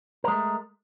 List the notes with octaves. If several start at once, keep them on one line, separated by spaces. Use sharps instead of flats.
G#3 A3 A#4